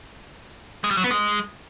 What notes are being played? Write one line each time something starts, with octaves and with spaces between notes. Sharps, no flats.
G#3
G3
F#3
B3
G#3